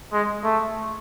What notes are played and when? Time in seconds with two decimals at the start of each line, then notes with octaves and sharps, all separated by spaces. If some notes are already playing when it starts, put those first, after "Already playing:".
0.13 G#3
0.44 A3